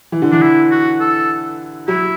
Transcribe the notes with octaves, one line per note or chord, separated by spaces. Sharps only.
E3
D3
E3 D4
E4
F#4
A4
F#3 E4